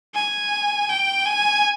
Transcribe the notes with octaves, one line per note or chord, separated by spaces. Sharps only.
G#5
G5
G#5